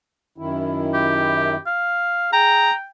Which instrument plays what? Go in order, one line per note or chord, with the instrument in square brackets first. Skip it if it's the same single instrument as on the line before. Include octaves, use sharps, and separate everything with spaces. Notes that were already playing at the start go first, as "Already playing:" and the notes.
[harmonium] F#2 D#3 E4
[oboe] G4
F5
[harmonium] G#4 [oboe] G5 [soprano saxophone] A#5